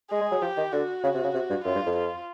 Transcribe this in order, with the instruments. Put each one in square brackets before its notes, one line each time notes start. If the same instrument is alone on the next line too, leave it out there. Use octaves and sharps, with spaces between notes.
[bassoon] G#3 [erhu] G#4
[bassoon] G#3
F#3
[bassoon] F3 [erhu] G4
[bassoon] D#3
[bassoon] D3 [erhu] F#4
[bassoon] C#3
C3
C#3
C3
G2
[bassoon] F#2 [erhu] F4
[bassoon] G2
F2
[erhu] F4